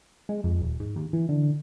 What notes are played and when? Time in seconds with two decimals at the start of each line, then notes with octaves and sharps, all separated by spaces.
0.29 G#3
0.44 F2
0.62 D#1
0.80 G#2
0.96 D#2
1.13 E3
1.29 D3